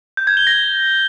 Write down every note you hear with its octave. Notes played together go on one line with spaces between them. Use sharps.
G6
G#6
G7
A#6